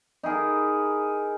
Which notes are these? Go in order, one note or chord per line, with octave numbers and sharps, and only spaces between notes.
D#4 E4 G#4 A#4